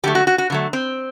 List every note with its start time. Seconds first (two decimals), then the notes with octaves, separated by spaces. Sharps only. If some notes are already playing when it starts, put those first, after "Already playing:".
0.04 D3 F#3 A3 G4
0.15 F#4
0.27 F#4
0.38 F#4
0.50 D3 F#3 A3
0.73 C4